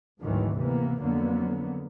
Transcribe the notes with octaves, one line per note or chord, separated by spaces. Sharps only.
G#1 D2 G#2 D#3 E3 F#3
C3 E3 A#3 B3
F2 D3 F#3 A#3 B3